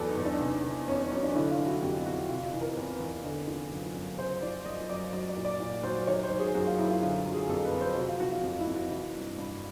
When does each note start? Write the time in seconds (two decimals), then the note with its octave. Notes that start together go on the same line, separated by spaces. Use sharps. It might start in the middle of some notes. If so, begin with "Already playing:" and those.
Already playing: E2 F#3 A4 B4 D5
0.09 D#4
0.17 E2
0.25 D4
0.41 C3
0.64 D#3
0.88 F2 C#4
1.12 F#3 C#4
1.23 D4
1.35 D3 E4
1.51 F4
1.58 F#3
1.66 F#4
1.82 F2 G4
2.06 F2 F#4
2.29 C3 F4
2.45 F4
2.53 E3
2.61 A#4
2.77 E2 B4
3.00 E2
3.24 D3
3.47 F3
3.72 F#2
3.95 F#2
4.18 C#3 C5
4.42 F3 D5
4.65 F#2 D#5
4.89 F#2 D5
5.13 F#3 D5
5.29 D5
5.37 A#2
5.45 D5
5.60 A#2
5.83 F#3 C5
6.07 D#3 C#5
6.23 C5
6.31 F#3
6.39 G#4
6.54 F#2 F#4
6.66 F4
6.78 F#2 E4
6.90 F4
7.02 D3 F4
7.26 F#3
7.34 G#4
7.49 F2 A4
7.65 B4
7.73 F2
7.81 C5
7.96 C3 F#4
8.09 F4
8.20 F3 F#4
8.32 F4
8.44 F2 F4
8.59 E4
8.67 F2
8.75 F#4
8.91 E3
9.15 G2
9.38 G2